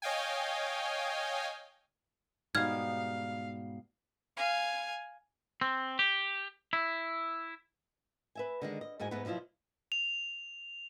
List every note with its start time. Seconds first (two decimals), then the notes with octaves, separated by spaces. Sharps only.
0.02 C#5 D#5 F5 G5 G#5
2.55 G#2 B2 G3 B3 D#4 F5 F6 G#6
4.37 F5 G#5
5.61 C4
5.99 G4
6.73 E4
8.35 B4 E5 G#5
8.62 D3 D#3 G#3
8.81 D#5
9.00 E2 G#2 G#3 F#4 G#5
9.11 G#2 A3 B3 B4
9.25 B2 F3 F#3 E4 F4
9.92 F7